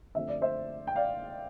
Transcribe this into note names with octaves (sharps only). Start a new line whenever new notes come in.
D3 F3 A3 C4 E5
D5
C5 E5
G5
D5 F5